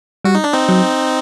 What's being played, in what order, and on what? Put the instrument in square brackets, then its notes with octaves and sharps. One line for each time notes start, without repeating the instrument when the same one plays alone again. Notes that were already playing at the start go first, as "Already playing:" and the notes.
[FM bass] G3 [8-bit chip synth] F#4
[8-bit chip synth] D#4
D4
C4 D#4
[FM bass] F#3